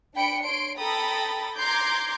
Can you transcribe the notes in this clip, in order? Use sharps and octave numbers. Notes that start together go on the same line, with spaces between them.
D4 G5 B5 C#7 D7
C#5 C6 D7
A4 G5 A#5 B5 D#6 A6
A#5 C6 D6 G6 G#6